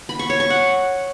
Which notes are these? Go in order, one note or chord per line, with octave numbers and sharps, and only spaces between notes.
B5
C#6
C#5
C#6
F#5